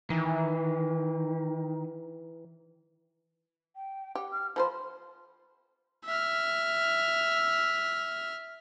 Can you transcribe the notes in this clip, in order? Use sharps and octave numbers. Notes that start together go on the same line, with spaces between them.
D#3 E3
G5
G4 F#5
F6
F3 A4 C5 B5
E5 F6